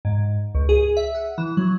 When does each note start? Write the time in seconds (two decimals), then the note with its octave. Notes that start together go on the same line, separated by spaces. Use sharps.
0.05 G#2
0.55 C#2
0.69 G#4
0.97 E5
1.15 F#5
1.38 E3
1.57 F#3